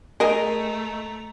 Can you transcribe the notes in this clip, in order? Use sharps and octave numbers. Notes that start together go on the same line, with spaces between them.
A3 G#4 A#4 D#5 A#5